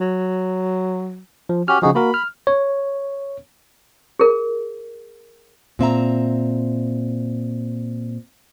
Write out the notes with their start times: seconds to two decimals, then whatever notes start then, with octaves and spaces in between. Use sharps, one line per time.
0.01 F#3
1.49 F3
1.68 C#4 F#4 G4 F6
1.82 C#3 F3 D#4 F#4 G#4
1.95 A#3 F#4 A#4 B5
2.14 F6
2.47 C#5
4.19 G#4 A#4
5.79 A#2 C4 E5 A#5